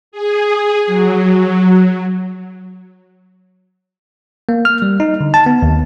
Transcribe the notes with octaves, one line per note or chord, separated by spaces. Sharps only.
G#4
F#3
A#3
F6
G3
D#4
D3
A5
B3
D#2